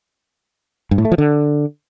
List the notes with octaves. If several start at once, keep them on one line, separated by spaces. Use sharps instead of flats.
G2
A2
A3
F3
D3